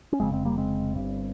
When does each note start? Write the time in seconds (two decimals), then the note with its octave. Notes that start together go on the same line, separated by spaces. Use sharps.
0.12 C#4
0.20 F1 F2 C#3 G#3 C4
0.32 G#3 C4
0.45 G3 A#3
0.58 G#3 C4
0.95 G1 G2